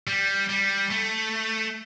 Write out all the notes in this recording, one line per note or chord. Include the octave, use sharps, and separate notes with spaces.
G3
G3
A3